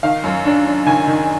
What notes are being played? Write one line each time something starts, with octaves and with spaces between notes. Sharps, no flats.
D#3 F5
F#2
D4
D4
D#3 G#5
D#3